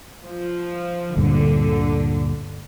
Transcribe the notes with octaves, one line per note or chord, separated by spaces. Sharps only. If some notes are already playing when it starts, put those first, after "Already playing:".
F3
D2 G2 A#2 D3